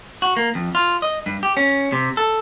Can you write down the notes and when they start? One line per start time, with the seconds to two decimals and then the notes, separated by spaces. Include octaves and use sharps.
0.22 F#4
0.37 A#3
0.55 F2
0.75 F4
1.02 D#5
1.26 G2
1.43 G4
1.57 C#4
1.92 C3
2.17 A4